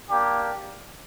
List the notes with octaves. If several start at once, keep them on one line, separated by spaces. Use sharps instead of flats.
A#3 D4 G4